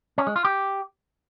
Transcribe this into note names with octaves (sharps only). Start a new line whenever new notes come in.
C#4
G#3
F4
G4